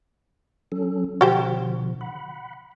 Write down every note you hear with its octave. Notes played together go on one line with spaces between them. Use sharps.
F#3 C#4 A4
B2 D3 F3 F#4 G4 C5
F#5 B5